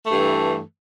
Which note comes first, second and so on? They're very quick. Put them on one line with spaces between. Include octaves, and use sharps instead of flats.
A3 G2 E3